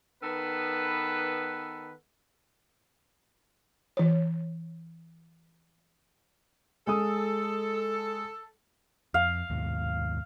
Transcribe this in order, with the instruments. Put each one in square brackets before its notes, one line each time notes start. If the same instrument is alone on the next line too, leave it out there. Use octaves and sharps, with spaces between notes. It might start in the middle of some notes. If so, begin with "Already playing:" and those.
[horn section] D#3 B3 A4 B4
[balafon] E3 C#5
[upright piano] G#3 D#6 [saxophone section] A4
[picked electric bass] F2 [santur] F5
[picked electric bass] D#2 G#2 B2